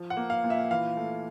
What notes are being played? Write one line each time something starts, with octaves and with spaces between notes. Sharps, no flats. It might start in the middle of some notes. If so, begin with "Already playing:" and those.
Already playing: F3
F#5
A#3
F5
A#2
E5
E3 F5
A3